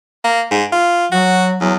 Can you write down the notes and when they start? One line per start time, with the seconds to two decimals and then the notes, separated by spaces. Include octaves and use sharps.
0.24 A#3
0.51 G#2
0.72 F4
1.12 F#3 F#4
1.61 E2 F#3